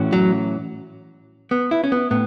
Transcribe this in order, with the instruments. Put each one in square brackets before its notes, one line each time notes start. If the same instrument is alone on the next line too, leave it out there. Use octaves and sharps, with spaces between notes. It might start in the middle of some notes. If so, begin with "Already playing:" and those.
Already playing: [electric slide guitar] A2 E3 C#4 F#4
[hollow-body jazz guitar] F#3
B3
E4
C#4
B3
[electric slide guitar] A2 [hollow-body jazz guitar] B3